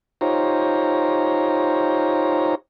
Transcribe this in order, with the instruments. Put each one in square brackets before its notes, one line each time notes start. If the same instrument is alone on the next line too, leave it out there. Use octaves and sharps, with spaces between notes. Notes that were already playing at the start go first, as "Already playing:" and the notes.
[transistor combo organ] D#4 F4 G4 C5 C#5 A#5